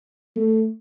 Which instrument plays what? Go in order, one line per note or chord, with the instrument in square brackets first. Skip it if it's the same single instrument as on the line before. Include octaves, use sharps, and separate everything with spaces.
[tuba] A3